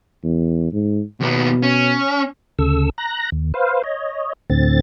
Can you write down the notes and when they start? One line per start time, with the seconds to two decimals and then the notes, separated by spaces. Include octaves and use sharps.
0.24 E2
0.72 G#2
1.21 D#2 B2 B3
1.63 C#4
2.59 D2 C#3 A4 E6
2.98 A#5 F#6 A#6
3.32 D#2
3.54 B4 C5 F5
3.84 C#5 D#5
4.50 D2 A2 D3 C4 A6